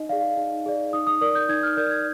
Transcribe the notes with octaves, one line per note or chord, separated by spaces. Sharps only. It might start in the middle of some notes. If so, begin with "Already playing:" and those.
Already playing: D#4 D#5
G#4 D5 F5
D#4
G#4 D5
D#4 D#6
D#6
A#4 D5 D#6
G6
D#4 G#6
F6
A#4 D5 G6
G#6